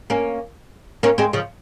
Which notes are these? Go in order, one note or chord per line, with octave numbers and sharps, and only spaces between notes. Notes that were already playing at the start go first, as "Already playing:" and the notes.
A#3 C#4
A#3 C#4
G#3 C4
C#3 F3